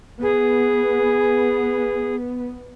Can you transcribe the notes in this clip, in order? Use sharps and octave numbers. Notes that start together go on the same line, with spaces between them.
B3 G#4